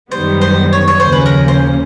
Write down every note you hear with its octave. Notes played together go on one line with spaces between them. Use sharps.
F#2 D#3 G3 B3 C5
C5
C#5
C#5
D#2 C#3 F3 A#3 C#4 C5
B4
A#4
C5